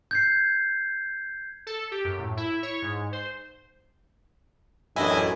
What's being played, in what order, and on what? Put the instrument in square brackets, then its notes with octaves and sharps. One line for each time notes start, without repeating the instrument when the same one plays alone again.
[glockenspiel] G6 G#6 C7
[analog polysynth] A4
G4
F#2
A2
E4
C#5
G#2
C5
[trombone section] A1 F#2 [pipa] C3 D#3 E4 [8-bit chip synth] D4 D#5 G#5